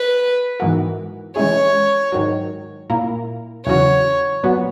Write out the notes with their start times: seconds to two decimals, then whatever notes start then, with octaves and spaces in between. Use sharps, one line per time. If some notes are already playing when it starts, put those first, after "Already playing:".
Already playing: B4
0.60 G#2 E3 B3 F#4 A#4
1.36 E3 G#3 C#4 E4 G#4 C#5
2.12 G#2 D#3 F#3
2.90 A#2 A#3 E4 A#4
3.66 E2 C#3 F#3 C#4 F#4 C#5
4.43 A#2 F#3 B3 F#4